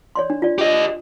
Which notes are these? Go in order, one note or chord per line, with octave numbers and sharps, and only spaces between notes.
C#5 D5 C6
D4
F4 D5
G4 D#5